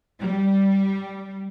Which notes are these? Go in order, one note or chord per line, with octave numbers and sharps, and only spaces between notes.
G3